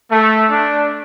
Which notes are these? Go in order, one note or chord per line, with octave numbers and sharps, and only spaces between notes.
A3
D4